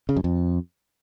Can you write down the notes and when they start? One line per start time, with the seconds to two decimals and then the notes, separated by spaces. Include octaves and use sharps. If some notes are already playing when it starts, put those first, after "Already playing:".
0.09 C#3
0.16 F#2
0.24 F2